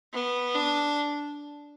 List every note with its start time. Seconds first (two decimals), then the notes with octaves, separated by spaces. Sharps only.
0.13 B3
0.55 D4